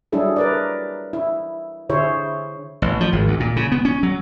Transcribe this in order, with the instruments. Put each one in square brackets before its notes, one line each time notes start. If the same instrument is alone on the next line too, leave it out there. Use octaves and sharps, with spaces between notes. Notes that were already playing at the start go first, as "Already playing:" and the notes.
[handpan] F#3 G3 D4 E4 G#4 A4
A#4 B4 D5
E4
D3 E4 G#4 C5 C#5
[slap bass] A1
F3
G#1
D2
A#2
C#3
B3
C#4
F#3